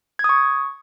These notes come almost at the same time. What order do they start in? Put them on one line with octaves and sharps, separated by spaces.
G#6 D#6 C#6